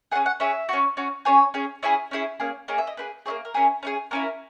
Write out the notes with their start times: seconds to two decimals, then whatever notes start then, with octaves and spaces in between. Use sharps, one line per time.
0.11 G#4 F#5
0.15 C#4
0.26 F#5
0.40 C#4 G#4 E5
0.69 C#4 F#4
0.97 C#4 F#4
1.25 C#4 G#4 C#5
1.54 C#4 G#4
1.83 C#4 E4 G#4 E5
2.11 C#4 E4 G#4
2.40 A#3 C#4 G#4
2.68 A#3 C#4 G#4 D#5
2.78 E5
2.87 D#5
2.97 A#3 E4 G#4 B4
3.26 A#3 E4 G#4 C#5
3.45 A#4
3.54 C#4 E4 G#4
3.83 C#4 E4 G#4
4.11 A#3 C#4 E4 A#4